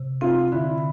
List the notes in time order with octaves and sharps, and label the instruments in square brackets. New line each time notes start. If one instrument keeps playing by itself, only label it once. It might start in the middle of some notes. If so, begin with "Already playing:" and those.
Already playing: [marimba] C3
[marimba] C4 [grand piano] F4
[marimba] D3 [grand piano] E4